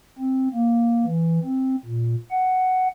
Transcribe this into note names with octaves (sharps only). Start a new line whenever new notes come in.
C4
A#3
E3
C4
A#2
F#5